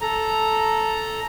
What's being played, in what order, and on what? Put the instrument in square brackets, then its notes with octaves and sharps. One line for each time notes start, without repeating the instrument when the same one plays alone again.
[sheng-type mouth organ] A4 A#5